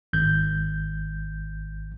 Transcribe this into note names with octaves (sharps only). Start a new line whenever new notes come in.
G#1 G6